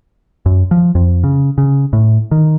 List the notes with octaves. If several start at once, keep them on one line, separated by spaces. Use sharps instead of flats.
F#2
F3
F2
C#3
C#3
A2
D#3